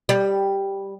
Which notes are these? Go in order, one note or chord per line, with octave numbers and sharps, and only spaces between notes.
G3